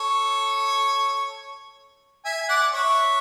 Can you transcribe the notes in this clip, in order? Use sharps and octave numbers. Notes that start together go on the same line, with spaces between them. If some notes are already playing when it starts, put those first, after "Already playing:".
Already playing: A4 C#5
E5 G#5
G#5
D5 F#5
C#5 E5